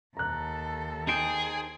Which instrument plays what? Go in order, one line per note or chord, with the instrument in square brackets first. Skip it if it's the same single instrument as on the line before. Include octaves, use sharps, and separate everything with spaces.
[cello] D#2 A4 [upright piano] A#5 F#6
[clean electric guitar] D#4 C5 G5 [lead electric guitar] G#4